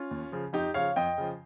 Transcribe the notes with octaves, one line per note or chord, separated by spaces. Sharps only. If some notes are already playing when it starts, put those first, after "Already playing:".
Already playing: C#4 F4
D#2
C#3 F3
F2 D#4 G4
C#3 F3 C#5 F5
F2 D#5 G5
C#3 F3